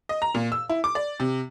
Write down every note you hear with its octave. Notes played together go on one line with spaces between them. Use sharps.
D#5
A#5
A#2
E6
E4
D6
D5
C3